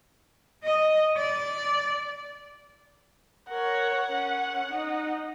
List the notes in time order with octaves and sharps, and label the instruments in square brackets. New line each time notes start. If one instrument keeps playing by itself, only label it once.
[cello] D#5
D5
[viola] A#4 C#5 [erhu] F#5
[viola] C#4
D#4